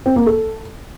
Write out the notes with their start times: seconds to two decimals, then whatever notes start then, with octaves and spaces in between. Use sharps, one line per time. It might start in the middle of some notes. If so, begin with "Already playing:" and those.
0.06 C4
0.16 A#3
0.26 A4